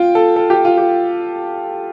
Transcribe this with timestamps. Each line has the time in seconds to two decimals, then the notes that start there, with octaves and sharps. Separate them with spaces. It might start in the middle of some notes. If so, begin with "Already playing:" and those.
Already playing: F4 G5
0.15 A4
0.36 A4
0.50 G4
0.65 F4
0.78 G4